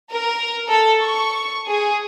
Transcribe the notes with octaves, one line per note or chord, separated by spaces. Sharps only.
A#4
A4
C#6
G#4